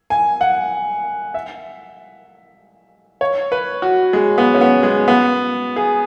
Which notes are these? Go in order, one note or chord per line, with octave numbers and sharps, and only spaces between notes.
G#5
F#5
E5
C#5
B4
F#4
G#3
B3
C#4
B3
G#3
B3
G#4